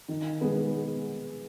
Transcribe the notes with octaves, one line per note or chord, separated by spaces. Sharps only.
D#3
G#3 B3